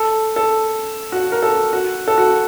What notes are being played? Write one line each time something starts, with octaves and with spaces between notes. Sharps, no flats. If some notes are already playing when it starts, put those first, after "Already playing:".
Already playing: A4
A4
F#4
A#4
A4
F#4
A4
F#4